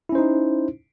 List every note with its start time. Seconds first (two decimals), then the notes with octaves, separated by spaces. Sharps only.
0.09 E4
0.12 C#4
0.15 C5
0.18 D#4